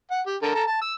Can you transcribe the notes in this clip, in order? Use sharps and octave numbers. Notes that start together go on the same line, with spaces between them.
F#5
G4
D3 A4 A#4
A4 A5 A#5
A5
E6